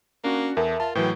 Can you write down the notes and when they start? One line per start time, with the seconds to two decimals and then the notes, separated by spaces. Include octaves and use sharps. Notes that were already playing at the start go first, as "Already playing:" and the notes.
0.24 A#3 C#4 D4 F#4
0.57 E2 A4 A#4 E5
0.80 F4 A5
0.95 A2 E3 F#3 B4 G5